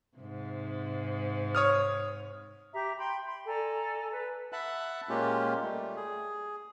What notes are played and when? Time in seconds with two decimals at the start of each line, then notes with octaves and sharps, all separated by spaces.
0.17 G#2 C3
1.55 C#5 D#6 F6
2.73 G4 E5 A#5
2.97 G5 B5 C6
3.25 B5 C6
3.47 A4 D5 G#5 A#5
4.11 B4
4.52 E5 F#5 A5 B5 F#6
5.09 A#2 G#3 A#3 C#4 F4 G4
5.62 G3 A3
5.96 G#4